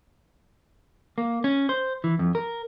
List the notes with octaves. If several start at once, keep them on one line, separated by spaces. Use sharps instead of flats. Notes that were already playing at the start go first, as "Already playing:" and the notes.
A#3
C#4
C5
E3
F2
A#4